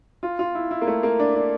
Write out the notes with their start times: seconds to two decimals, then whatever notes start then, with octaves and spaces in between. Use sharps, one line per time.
0.23 F4
0.39 F4
0.55 E4
0.71 E4
0.81 A#3
0.87 A3
1.03 A#3
1.19 D4
1.36 D4